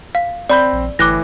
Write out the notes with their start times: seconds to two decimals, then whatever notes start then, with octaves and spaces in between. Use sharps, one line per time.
0.15 F5
0.50 C4 D5 B5 G6
0.72 A#1
0.99 G1 A2 E3 D6 F#6 A#6